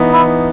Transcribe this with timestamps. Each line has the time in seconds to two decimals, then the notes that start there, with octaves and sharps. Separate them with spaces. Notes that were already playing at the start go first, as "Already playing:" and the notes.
Already playing: E3 B3 D#4
0.13 E4